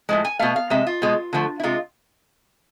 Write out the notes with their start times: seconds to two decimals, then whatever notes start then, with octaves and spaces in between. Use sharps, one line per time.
0.09 A2 F3 G#3
0.25 G#5
0.39 B2 A3 F5
0.56 F5
0.70 C3 G#3 E5
0.87 F4
1.02 B2 G#3
1.33 D3 F3 A3
1.60 E4
1.63 C3 G#3 F4